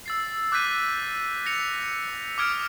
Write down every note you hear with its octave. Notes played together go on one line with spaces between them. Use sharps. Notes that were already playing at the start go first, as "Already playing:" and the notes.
E6 A6 C7
D6 F#6 G6 A6 B6 D#7
A#6 B6 C#7 F7
D6 D#6 F6 G#6 D7